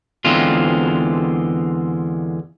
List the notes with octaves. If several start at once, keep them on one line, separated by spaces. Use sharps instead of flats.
E2 D3 G#3 C4 F4